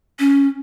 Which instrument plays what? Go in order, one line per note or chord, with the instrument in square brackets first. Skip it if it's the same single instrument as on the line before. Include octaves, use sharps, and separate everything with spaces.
[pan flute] C#4